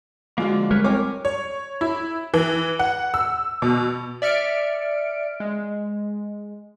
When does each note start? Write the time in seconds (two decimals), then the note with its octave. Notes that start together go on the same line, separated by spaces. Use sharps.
0.38 D3 F3 G#3 A#3 F4 F#4
0.71 G3 G#3 A#4 B4 C#5
0.84 C4 A#4 C#5 G#5 D6
1.25 C#5
1.81 E4
2.34 E3
2.79 F#5
3.14 E6
3.62 B2
4.22 D5 E5 F6 C#7 D7
5.40 G#3